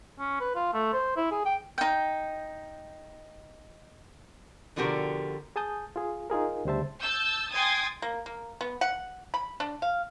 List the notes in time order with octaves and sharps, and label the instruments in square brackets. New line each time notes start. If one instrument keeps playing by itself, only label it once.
[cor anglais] C#4
B4
F4
A3
C5
E4
G#4
G5
[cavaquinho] D#4 G5
[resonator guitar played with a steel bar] B2 D3 F3 F#4 G4 A#4
[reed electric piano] G#4 G#5 A5 D#6 G6
F4 G#4
D#4 F4 G#4 A#4
D2 C#3 G3 C5 E5 A5
[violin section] A5 E6 G6
G5 G#5 C6 D#6 G#6 A6
[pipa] A#3
A#3
B3
F#5
B5
D4
F5